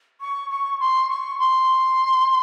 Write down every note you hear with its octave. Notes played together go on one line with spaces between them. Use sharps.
C#6
C#6
C6
C#6
C6